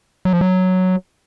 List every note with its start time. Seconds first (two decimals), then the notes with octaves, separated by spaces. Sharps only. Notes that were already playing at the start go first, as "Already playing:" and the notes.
0.25 F#3
0.33 F3
0.41 F#3